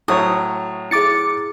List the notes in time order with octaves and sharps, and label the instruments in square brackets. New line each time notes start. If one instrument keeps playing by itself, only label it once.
[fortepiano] A2 F#3 C#5 [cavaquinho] D#6
[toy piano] E4 G#4 [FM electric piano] D6 A6 C#7